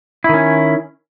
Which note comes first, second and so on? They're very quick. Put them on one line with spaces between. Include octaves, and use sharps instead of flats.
E4 D#3 C#4